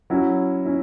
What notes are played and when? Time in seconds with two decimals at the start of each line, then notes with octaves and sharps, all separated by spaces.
0.10 F#3 C#4 E4
0.65 C#4 E4